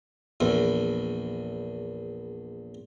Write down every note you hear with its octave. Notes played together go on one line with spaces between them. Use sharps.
A#1 E2